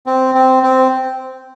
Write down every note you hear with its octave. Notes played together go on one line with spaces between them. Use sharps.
C4
C4
C4